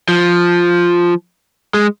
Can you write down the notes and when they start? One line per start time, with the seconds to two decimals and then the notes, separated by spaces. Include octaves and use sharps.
0.09 F3
1.74 G#3